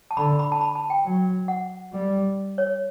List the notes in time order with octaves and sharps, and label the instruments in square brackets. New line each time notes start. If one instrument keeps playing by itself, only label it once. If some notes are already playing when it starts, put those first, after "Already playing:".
[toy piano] A5
[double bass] D3 [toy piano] B5
[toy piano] B5
A5
B5
A5
G5
[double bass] F#3
[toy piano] F#5
[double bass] G3
[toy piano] C#5